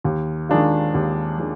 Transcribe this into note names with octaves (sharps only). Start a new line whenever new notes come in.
D#2
D#3 G#3 D4 F4
D#2
D#3 G#3 D4 F4